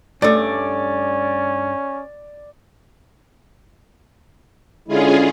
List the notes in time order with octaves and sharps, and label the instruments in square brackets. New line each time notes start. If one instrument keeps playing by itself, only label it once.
[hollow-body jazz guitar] G2 A3 [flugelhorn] C#4 [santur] D5
[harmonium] D3 G#3 E4 [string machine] C#4 F4 G#4